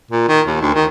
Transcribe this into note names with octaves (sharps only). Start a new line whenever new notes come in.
A#2
D#3
D#2
D2
D#3